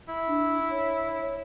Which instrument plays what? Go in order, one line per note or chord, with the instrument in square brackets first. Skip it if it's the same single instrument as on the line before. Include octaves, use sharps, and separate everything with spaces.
[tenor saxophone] E4
[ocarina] D4
C#5
C#5